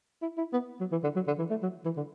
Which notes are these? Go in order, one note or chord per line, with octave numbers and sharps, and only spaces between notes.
E4
E4
B3
F#3
E3
D3
F#3
D3
E3
A3
F#3
E3
D3